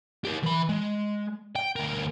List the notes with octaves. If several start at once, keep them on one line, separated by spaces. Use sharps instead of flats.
G4 A#4
E3 B5
G#3
G5
D2 A#4